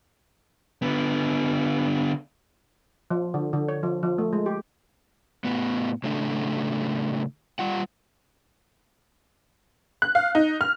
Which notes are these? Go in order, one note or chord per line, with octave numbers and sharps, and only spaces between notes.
D3 B3
F3
D3
D3
C#5
F3
F3
A3
G#3
G4
A2 B3
A2 C#3 A3 D4
G3 F4 F#5
F#6
F5
D#4
F6